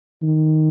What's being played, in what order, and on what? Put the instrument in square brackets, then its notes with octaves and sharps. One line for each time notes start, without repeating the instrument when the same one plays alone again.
[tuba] D#3